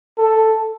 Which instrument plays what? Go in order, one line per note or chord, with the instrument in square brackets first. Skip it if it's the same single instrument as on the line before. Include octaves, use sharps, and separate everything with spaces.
[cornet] A4